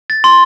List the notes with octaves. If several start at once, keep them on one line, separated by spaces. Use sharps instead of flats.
A6
C6